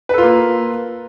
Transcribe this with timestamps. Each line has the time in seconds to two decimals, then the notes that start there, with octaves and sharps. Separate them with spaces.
0.09 B4
0.14 A4
0.18 F4
0.22 A#3